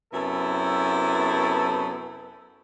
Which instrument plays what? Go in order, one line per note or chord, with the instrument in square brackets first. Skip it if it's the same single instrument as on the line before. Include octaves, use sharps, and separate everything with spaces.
[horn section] F#2 C3 B3 E4 A4